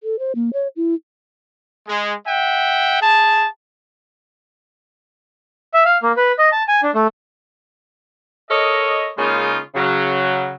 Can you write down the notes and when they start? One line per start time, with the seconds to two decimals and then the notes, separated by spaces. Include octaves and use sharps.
0.03 A4
0.19 C5
0.35 A#3
0.53 C#5
0.76 E4
1.87 G#3
2.27 E5 F#5 G5
3.01 G#4 A5
5.74 E5
5.85 F5
6.03 A#3
6.17 B4
6.39 D#5
6.52 A5
6.68 G#5
6.83 D4
6.94 A3
8.50 A4 A#4 C#5 D#5
9.17 C#3 G#3 A#3 C#4 D#4 F4
9.75 C#3 F#3